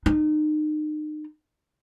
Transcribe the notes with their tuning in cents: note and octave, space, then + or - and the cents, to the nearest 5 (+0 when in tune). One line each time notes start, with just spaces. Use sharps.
D#4 -35